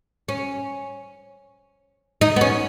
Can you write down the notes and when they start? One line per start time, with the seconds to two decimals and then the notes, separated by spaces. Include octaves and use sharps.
0.29 C#4
2.21 D#4
2.36 B3
2.41 C#4